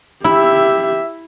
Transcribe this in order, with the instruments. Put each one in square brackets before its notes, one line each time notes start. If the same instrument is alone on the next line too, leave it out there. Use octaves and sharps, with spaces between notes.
[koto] E4 [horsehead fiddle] G4 E5